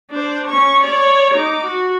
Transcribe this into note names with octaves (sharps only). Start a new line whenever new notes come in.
D4 C5
C#4 C#6
C#5 D5
D#4 D6
F#4